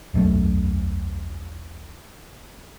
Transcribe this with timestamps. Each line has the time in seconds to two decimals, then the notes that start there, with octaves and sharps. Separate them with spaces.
0.14 E1 B1 F#2 A3